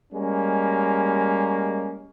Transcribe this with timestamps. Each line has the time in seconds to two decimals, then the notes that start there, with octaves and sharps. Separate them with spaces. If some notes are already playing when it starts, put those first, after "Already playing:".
0.13 G3 G#3 A#3 C#4